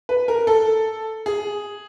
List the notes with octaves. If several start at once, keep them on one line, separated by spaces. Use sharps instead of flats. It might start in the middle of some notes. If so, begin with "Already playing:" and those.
B4
A#4
A4
G#4